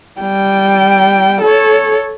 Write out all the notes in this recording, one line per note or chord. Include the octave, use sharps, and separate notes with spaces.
G3 G5
A4 C#5